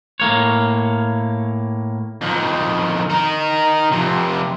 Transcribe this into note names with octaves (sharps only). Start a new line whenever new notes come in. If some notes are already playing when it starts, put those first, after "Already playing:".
A2 A#3 C#5
F2 D#3
D#4 A#4
F2 C3